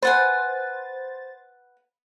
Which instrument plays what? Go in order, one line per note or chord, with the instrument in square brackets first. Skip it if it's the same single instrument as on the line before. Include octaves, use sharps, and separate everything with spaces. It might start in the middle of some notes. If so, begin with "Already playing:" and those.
[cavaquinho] B4 F#5 G#5 [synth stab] C5 A6